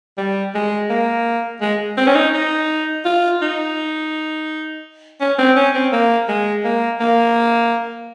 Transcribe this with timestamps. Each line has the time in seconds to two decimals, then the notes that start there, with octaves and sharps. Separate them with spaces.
0.17 G3
0.55 G#3
0.90 A#3
1.61 G#3
1.97 C4
2.07 C#4
2.15 D#4
2.34 D#4
3.05 F4
3.42 D#4
5.20 C#4
5.38 C4
5.56 C#4
5.74 C4
5.92 A#3
6.28 G#3
6.64 A#3
7.00 A#3